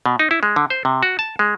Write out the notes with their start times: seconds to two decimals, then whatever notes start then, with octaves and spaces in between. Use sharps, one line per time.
0.06 B2
0.19 D#4
0.31 E4
0.43 G#3
0.56 D3
0.70 C5
0.85 C3
1.03 F#4
1.19 A5
1.39 G#3